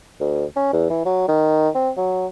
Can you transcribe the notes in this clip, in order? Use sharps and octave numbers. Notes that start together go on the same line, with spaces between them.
D2
C#4
E2
E3
F#3
D#3
C4
F#3